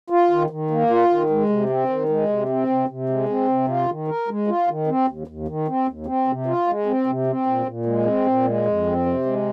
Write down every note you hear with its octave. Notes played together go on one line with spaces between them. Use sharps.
F4
D#3
D#3
A#3
F4
D#3
G#3
C3
C4
D#3
G#3
C3
C4
C3
C3
G#3
C4
C3
F4
D#3
A#4
G#3
F4
D#3
C4
D#2
D#2
D#3
C4
D#2
C4
C3
F4
G#3
C4
C3
C4
A#2
A#2
G#3
C4
A#2
G#3
F2
C4
C3
G#3